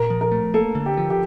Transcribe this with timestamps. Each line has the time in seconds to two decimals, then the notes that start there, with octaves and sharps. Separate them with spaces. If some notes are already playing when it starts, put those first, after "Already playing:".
Already playing: A#2 A#4
0.10 F3
0.21 A#4
0.32 A3
0.54 A#3 A4
0.75 D3
0.86 G4
0.97 F3
1.10 G4